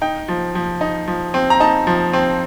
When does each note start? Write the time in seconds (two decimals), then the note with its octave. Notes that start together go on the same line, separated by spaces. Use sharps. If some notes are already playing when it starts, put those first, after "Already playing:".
0.02 D#4 G5
0.28 F3
0.55 F3
0.81 D#4
1.07 F3
1.34 C4
1.50 A#5
1.60 D#4 A5
1.87 F3
2.13 C4